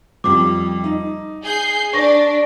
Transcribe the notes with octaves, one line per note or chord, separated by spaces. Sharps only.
F2 G3 D6
D#4
G#4 G6 C7
D4 C#6 A#6